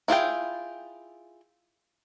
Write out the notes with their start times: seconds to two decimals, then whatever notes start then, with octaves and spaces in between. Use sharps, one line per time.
0.08 E4 F4 G#4 G5